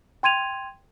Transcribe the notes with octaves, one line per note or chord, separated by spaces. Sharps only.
G5 C6 G#6 D#7 F7